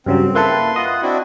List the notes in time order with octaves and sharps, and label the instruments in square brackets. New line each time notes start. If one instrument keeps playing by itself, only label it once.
[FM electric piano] G2 C#3 F#3 [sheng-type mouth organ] C4
[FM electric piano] A#3 E4 A4 [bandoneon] B4 C6
[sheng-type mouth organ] F4 F#5 [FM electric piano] D#5
[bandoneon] C4 E4 [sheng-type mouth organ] D4 F#4